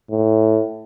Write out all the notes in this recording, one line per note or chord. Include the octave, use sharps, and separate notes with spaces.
A2